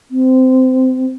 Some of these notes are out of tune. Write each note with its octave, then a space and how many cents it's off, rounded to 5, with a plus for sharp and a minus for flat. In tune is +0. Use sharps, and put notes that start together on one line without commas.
C4 -20